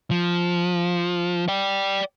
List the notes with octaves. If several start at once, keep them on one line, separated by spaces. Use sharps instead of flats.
F3
D5 G5